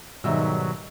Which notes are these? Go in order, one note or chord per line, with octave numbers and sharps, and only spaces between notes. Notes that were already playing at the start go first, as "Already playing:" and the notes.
G#2 B2 D#3 F#3 G3 E5 E6